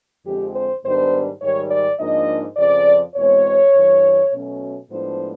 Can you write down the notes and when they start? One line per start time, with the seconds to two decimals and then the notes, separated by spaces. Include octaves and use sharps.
0.24 F2 D3 F3 G#3 C4 G4
0.54 C5
0.84 G#2 D#3 G3 B3 D4 C5
1.41 G#2 D#3 G3 C#5
1.70 D5
1.99 G#2 F3 A#3 D4 D#5
2.57 F2 C#3 F3 D5
3.15 E2 B2 G#3 C4 C#5
3.74 G2 E3 G3
4.32 B2 F#3 A3 C#4
4.90 A2 F3 G#3 B3 D4 C5